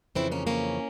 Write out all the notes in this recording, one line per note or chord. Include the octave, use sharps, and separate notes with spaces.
F2 C#3 E3 C4 E4
A#3 C#4
A#3 C#4